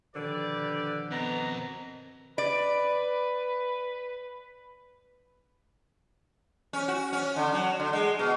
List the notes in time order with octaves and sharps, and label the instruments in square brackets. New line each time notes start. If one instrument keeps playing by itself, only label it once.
[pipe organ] B2 D#3 F3 [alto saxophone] D3 [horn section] G4 B4 D5
[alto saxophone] B3 [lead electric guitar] C4 D#5 [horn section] A#5
[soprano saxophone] B4 [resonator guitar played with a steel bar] D5
[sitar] C#4
F#4
C#4
D3
F#3
D3
G#3
B2